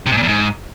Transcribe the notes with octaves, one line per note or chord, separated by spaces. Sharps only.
C3
G#2
A#2
E2
G#2